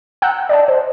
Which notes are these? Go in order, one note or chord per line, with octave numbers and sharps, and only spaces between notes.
F#5 G5 A#5 E6 F#6 G6
D5 D#5 A5
C5